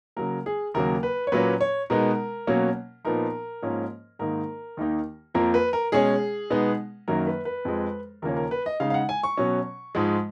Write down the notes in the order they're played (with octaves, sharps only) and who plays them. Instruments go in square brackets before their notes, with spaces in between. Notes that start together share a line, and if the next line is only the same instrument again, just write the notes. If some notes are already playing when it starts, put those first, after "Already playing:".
[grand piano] C#3 F#3 A#3 A#4
G#4
D#2 C#3 F#3 A#3 A#4
B4
C#5
A#2 F#3 A#3 C#4 B4
C#5
B2 G#3 B3 D#4 A#4
B2 F#3 A#3 C#4
A#2 F3 B3 D#4 A#4
G#2 F3 A#3 C#4
G#2 D#3 A#3 D#4 A#4
D#2 D#3 A#3 D#4
F2 F3 A#3 A#4
B4
A#4
B2 G#3 C#4 G#4
B2 G#3 B3 D#4
F#2 D#3 F#3 A#3 A#4
B4
B4
F2 F3 G#3
D#2 C#3 F3 A#3 C#4 A#4
A#4
B4
D#5
C#3 G#3 D#4 F5
F5
F#5
G#5
C#6
B2 F#3 C#4
G#2 F3 G#3